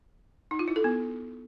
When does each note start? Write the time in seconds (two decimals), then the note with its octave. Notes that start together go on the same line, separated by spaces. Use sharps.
0.51 D#4
0.59 F4
0.68 E4
0.76 A4
0.84 B3